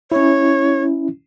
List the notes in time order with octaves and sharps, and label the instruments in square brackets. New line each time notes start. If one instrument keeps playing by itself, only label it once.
[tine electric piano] C#4 E4 [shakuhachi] C#5